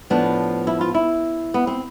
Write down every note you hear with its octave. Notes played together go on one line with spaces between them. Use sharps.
A2 F3 B3 D4
E4
F4
E4
B3
C4